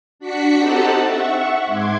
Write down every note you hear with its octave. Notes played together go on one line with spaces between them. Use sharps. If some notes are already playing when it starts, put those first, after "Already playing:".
D4 F#4 B6 C#7
C4 D#4 G4 A4 F#5 A5
E5 F#5 C#6
G#2 C6 D6 G#6